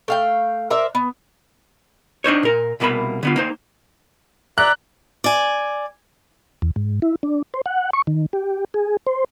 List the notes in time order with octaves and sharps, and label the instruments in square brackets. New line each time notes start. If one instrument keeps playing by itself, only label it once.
[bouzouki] A3 F5 G5
A#4 C5 D5 E5
B3
[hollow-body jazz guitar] D4 D#4 C5 C#5
A#2 A#4
C2 B2 A#3 E5 B5
D3 B3 F4
A#3 D#4 C5
[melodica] D5 E5 A#5 [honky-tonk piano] F#6
[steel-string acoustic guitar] D5 G#5
[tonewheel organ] E2
G#2
E4
D4
C5
F#5
C#6
D#3
G4
G#4
C5